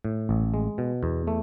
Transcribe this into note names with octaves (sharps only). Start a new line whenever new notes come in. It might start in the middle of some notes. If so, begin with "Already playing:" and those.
A2
A1
G#3
B2
E2
A3